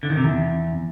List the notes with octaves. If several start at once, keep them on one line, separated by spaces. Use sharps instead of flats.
D3
D#3
C3
E2